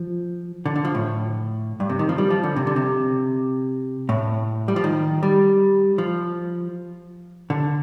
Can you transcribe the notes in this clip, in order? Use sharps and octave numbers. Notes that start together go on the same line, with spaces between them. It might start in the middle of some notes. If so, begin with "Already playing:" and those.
Already playing: F3
D3
D3
F3
A2
G2
C3
D#3
F3
G3
F3
D3
C3
D3
C3
A2
G3
F3
D#3
G3
F3
D3